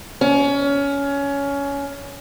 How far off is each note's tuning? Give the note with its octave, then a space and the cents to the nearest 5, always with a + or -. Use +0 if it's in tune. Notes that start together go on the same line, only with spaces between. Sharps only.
C#4 +20